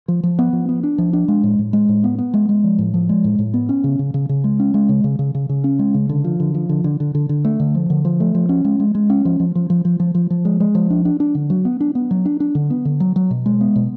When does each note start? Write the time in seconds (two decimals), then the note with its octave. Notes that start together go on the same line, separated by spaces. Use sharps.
0.08 F3
0.23 F3
0.39 B3
0.53 F3
0.69 B3
0.83 D4
0.98 F3
1.13 D4
1.28 G#3
1.43 A2
1.59 A2
1.73 G#3
1.89 A2
2.04 B3
2.18 B3
2.34 G#3
2.49 G#3
2.64 F3
2.78 A2
2.94 F3
3.09 G#3
3.24 A2
3.39 A2
3.54 B3
3.69 C#4
3.84 C#3
3.99 C#3
4.14 C#3
4.29 C#3
4.44 G#3
4.60 C#4
4.74 G#3
4.89 C#3
5.04 C#3
5.19 C#3
5.35 C#3
5.49 C#3
5.64 C#4
5.79 G#3
5.94 C#3
6.09 D3
6.24 F3
6.40 D3
6.54 F3
6.69 D3
6.84 D3
7.00 D3
7.15 D3
7.29 D3
7.45 A3
7.60 D3
7.75 F3
7.90 D3
8.05 F3
8.20 A3
8.35 F3
8.49 C#4
8.65 G#3
8.80 G#3
8.95 G#3
9.10 C#4
9.25 F3
9.40 F3
9.55 F3
9.70 F3
9.85 F3
10.00 F3
10.15 F3
10.30 F3
10.45 G#3
10.60 G#3
10.75 F3
10.90 D4
11.05 D4
11.20 D4
11.35 D3
11.50 F#3
11.65 B3
11.80 D4
11.95 B3
12.11 F#3
12.25 D4
12.40 D4
12.55 D3
12.70 B3
12.85 D3
13.00 F#3
13.16 F#3
13.30 B2
13.46 G#3
13.61 B3
13.76 B2